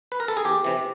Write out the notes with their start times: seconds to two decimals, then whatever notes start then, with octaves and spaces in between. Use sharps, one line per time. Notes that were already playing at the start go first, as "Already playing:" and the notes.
0.12 B4
0.20 A#4
0.28 A4
0.37 G#4
0.45 E2 G4
0.64 C3 E3